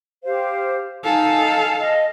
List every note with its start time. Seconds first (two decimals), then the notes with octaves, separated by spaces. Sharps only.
0.24 G4 C5 F5
1.04 D#4 A4 F5 G#5
1.79 D#5